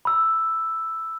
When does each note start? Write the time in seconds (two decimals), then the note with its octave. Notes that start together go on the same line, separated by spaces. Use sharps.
0.05 B5 E6